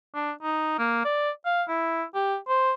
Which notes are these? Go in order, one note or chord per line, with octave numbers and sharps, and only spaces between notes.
D4
D#4
A#3
D5
F5
E4
G4
C5